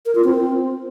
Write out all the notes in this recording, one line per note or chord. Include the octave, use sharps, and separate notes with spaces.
A#4
F4
C4